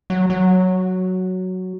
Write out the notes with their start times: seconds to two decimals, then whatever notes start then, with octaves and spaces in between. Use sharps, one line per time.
0.10 F#3
0.30 F#3